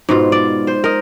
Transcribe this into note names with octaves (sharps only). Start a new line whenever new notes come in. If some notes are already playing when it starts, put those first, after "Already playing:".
G#2 B2 F4
D5
C5
A#4 D#5